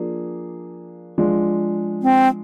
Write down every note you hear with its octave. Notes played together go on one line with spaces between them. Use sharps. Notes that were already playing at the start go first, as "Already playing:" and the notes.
Already playing: F3 A#3 D4 F4 G#4
F3 G#3 D4 F4 G#4
C4